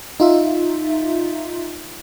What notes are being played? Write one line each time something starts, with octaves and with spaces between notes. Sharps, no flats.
D#4 F4 E5